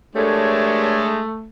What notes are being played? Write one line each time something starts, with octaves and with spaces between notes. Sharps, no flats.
G#3 A3 D4 G4 A#4 C#5